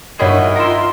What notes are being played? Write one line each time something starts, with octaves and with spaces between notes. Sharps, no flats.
G2 D#3 E4 F#4 G#4 C#5 B5
F4 A#4 E5 C6